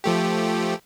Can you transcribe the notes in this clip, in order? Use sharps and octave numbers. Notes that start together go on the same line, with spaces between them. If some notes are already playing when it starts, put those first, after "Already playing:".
F3 A3 G4